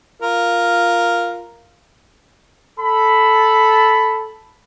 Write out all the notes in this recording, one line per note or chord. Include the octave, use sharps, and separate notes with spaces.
F4 A#4
A4 B5